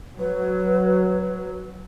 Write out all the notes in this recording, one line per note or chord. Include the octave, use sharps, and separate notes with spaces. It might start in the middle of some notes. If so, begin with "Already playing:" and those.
F#3 B4